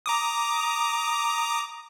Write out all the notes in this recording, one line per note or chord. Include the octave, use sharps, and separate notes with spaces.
A#5 D6 D#6